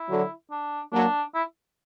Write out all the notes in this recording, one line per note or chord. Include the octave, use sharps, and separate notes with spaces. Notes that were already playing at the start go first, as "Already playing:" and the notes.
Already playing: E4
D3 F#3
D4
F#3 A#3 D4
E4